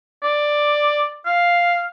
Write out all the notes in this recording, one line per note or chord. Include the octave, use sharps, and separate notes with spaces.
D5
F5